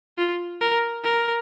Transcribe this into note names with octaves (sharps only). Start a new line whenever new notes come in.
F4
A#4
A#4